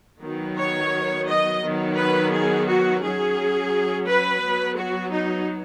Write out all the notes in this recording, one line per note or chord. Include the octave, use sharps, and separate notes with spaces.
D#3 F#3 B3
C#5
D#5
D#3 F#3 B3
B4
G#4
F#4
F#3 C#4 G#4
B4
F#3 B3
F#4
D#4